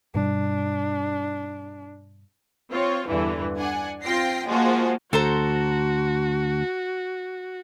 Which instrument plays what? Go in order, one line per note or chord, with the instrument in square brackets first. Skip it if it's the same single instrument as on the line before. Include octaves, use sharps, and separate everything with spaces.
[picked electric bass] G2 B2 G3 [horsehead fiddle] D4
[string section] C4 F4 C#5
E2 G2 D3 E3
D4 F#5 G#5
C4 F4 G5 A#6 C7
F3 G#3 A#3 F4 F#4
[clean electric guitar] D2 [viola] F#4 [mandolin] A4 C5 A#5